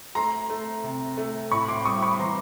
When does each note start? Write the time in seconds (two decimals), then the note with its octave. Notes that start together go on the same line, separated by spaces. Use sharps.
0.15 A3 A#5 C6
0.50 A3
0.84 C3
1.17 A3
1.52 A2 B5 C#6
1.68 C6 D6
1.86 G3 C#6 D#6
2.02 B5 C#6
2.19 E3 A#5 C6